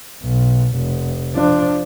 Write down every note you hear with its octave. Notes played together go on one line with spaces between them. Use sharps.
B1
F1
F3 D4